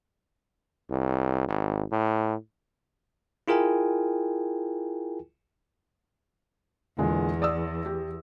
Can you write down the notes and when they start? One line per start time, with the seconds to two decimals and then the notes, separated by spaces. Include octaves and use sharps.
0.91 C2
1.48 G#1
1.92 A2
3.48 E4 F4 G#4 A#4 G5 G#5
6.98 E2 A#2 D3 G#3
7.42 D5 D#6 E6
7.86 G4